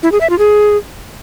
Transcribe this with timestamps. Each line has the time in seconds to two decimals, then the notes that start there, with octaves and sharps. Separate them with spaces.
0.03 E4
0.12 G#4
0.21 E5
0.30 F4
0.39 G#4